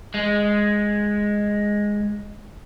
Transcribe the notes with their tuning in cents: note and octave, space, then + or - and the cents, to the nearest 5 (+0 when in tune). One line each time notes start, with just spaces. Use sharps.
G#3 -5